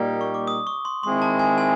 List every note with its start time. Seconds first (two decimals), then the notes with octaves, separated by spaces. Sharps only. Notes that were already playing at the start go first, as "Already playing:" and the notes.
Already playing: A#2 G3 A#3 D#4
0.21 C#6
0.34 D6
0.47 D#6
0.67 C#6
0.85 C6
1.03 D#3 G#3 C4 E4 C6
1.22 A5
1.39 G#5
1.58 G#5